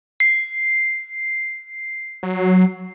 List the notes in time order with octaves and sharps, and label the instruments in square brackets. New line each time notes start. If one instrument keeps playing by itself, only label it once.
[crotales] C7
[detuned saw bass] F#3